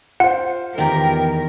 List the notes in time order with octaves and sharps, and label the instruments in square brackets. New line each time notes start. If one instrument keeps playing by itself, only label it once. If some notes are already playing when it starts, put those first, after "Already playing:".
[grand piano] F4 C5 [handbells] F#5
[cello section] E2 B3 A#4 [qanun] D#3 G4